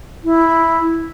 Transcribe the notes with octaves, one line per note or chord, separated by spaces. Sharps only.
E4